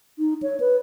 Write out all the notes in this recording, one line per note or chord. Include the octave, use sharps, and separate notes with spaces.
D#4
C#5
B4